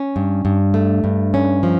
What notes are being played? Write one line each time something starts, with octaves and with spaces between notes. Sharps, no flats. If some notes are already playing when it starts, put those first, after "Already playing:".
Already playing: C#4
G2
G2
A3
G2
C#4
F3